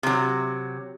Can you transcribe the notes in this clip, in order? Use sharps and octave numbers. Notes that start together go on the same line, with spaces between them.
C3 F#3